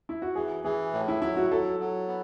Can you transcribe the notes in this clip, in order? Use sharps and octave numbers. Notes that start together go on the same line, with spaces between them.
E4
F#4
E3 G#4
E3 G#4
A2
E4
F#3 E4
F#4
F#3 A4
F#3
B3